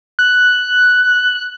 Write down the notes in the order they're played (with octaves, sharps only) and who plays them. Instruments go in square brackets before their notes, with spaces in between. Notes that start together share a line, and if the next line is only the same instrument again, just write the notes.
[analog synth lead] F#6